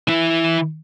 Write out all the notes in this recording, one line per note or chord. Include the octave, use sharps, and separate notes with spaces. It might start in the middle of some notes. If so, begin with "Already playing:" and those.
E3 E4